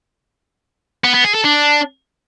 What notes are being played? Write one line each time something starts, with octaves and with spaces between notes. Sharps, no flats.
B3
B3
G#4
A4
D4